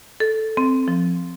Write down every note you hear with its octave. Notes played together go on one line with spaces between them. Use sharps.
A4
C4
F3